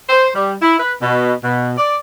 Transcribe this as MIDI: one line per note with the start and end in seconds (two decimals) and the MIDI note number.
0.09 0.29 72
0.35 0.54 55
0.62 0.78 64
0.80 0.94 71
1.02 1.33 47
1.44 1.73 47
1.78 1.98 74